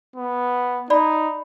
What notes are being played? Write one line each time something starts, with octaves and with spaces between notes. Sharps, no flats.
B3
D#4 D5 B5